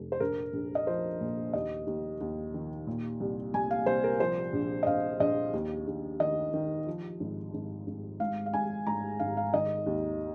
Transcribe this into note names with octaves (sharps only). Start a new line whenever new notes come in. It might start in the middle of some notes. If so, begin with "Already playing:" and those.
Already playing: F1
C5
A#1 A#4
A#1
D#5
F3 C5
A#2
D#2 D#5
D#2
D#2
D#3
A#2
C2
C2 G#5
F5
C2 C5
A#4
F3 C5
A#1
D#5
A#1 F5
A#1 D#5
D#2
D#2
D#3 D#5
D#3
F3
G#1
G#1
G#1
G#2 F5
F5
G#1 G#5
G#2 A#5
G#1 F5
F5
D#3 D#5
D#2